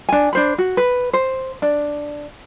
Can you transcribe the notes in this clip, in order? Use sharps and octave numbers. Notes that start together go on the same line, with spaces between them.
D4 G#5
D4 C5 B5
F#4
B4
C5
D4